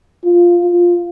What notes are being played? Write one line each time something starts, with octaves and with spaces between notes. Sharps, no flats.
F4
F4